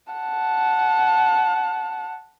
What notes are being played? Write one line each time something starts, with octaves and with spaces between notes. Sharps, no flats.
F#5 A5